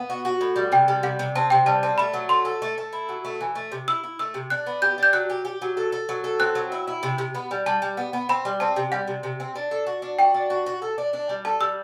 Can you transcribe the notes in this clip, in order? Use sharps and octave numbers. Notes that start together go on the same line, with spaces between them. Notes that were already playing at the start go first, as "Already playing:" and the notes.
Already playing: B3
F#4
F#4
A2
G3
C3 G5
G3
C3 F#5
C3
C4 A5
C3 G5
G3 A5
C4 A5
A3 B5
F#3
A3 C6
A4
A3
A3
E4
F#3
A3
E3
A3
C3
E4 E6
E4
A3 E6
C3
D4 F#6
B3
G4 G6
D4 G6
F#3 F#6
G4
G4
F#3
A4
A4
F#3
A4
C4 F#6
F#3
E4
E4
C3
C3
B3
G3
G3 A5
G3
B3
B3
C4 B5
G3
C4 A5
C3
G3 F#5
C3
C3
C4
D4
A4
F#4
D4
F#4 G5
D4
F#4
F#4
A4
D4
D4
G3
A4 A5
G3 E6